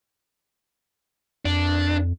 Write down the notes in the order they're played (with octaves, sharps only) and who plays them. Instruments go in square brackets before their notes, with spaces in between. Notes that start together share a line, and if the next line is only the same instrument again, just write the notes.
[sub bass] F2 [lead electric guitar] D4